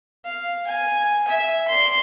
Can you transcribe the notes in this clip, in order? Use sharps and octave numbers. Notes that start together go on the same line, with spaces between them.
F5
G#5
E5
D5 C6